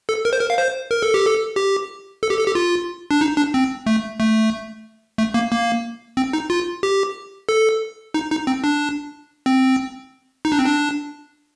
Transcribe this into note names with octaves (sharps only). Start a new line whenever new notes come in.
A4
A#4
C5
A#4
F5
C5
A#4
A4
G4
A4
G4
A4
G4
A4
G4
F4
D4
D#4
D4
C4
A3
A3
A3
A#3
A#3
C4
D#4
F4
G4
A4
D#4
D#4
C4
D4
C4
D#4
D4
C4
D4